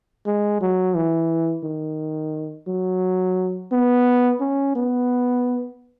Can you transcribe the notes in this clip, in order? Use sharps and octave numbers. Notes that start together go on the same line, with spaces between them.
G#3
F#3
E3
D#3
F#3
B3
C#4
B3